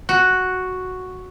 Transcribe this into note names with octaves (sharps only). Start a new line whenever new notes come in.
F#4